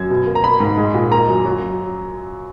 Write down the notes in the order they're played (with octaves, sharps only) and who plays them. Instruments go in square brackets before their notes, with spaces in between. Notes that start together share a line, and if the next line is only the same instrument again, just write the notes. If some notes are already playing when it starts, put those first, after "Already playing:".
Already playing: [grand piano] F#2 G#6
B2
A#3
A#5
A#3 B5
G#2
G#3
A#2
A#3 A#5
F#2
F#3